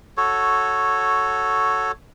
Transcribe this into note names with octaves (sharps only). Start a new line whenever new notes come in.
F#4 A4 C#5